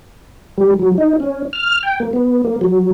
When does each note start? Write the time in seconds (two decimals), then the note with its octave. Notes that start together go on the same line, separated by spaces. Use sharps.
0.58 G3
0.79 F#3
0.98 D#4
1.20 C#4
1.53 F6
1.83 G5
2.00 A#3
2.13 B3
2.45 A#3
2.61 F#3